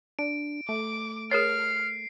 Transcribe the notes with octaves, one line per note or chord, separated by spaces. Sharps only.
D4 D7
A3 D6
G#4 A#4 C#5 F6 C7